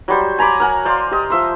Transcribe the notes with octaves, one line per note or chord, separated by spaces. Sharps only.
F#3 G3 C5
G#5 A#5 B5 D6
A#4 F#5 G#5
C5 D5 F5 C6
G4 D#5
F3 E5 C6